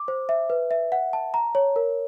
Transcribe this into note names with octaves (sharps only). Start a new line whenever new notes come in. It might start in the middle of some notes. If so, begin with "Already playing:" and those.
Already playing: D6
C5
E5
B4
E5
F#5
A5
A#5
C#5
A#4